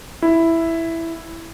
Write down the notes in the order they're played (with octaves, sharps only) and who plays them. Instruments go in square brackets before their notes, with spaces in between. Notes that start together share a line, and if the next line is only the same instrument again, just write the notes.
[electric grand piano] E4